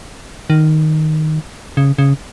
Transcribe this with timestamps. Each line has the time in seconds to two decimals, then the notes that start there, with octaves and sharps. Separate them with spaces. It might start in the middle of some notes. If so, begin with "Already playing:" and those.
0.50 D#3
1.77 C#3
1.98 C#3